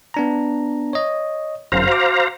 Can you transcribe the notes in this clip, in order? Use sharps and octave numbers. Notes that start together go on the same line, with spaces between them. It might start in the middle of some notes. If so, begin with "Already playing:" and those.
B3 D4 A#5
C#5 D#5
G1 F#2 C5 F5 A#5
F#4 D6